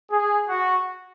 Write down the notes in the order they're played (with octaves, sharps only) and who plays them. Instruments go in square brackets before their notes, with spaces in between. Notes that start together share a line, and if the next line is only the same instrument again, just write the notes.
[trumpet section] G#4
F#4